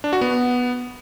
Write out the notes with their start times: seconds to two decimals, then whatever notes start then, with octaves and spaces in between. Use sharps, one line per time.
0.04 D4
0.13 F#4
0.21 B3